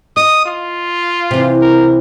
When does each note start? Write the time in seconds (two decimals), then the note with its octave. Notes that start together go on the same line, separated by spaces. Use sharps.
0.17 D#5 D#6
0.46 F4
1.31 C3 E3
1.61 A#4